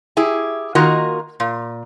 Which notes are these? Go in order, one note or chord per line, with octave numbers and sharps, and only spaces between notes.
E4 G4 G#4
D#3 A#3 F4 F#4 A#4 D#5
A#2